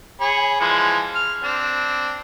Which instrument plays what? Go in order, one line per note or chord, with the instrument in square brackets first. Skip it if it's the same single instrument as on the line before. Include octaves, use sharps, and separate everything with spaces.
[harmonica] G#4 C#5 B5
E3 F3 G#3
F6
C4 D4